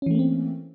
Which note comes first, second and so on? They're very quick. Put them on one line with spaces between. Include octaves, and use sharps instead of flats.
C#4 E3 A3 A#3 C4